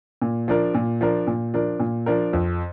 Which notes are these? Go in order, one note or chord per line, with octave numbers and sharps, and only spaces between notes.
A#2
F3 D4 A#4
A#2
F3 D4 A#4
A#2
F3 D4 A#4
A#2
F3 D4 A#4
F2